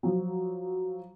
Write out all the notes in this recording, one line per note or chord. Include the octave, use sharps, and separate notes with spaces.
F3 F#3